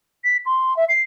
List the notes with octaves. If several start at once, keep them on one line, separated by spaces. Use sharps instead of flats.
B6
C6
E5
C7